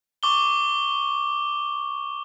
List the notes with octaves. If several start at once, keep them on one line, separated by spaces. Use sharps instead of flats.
C#6 D6 G7